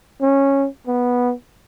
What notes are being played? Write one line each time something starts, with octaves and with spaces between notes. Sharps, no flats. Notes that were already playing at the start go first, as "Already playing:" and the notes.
C#4
B3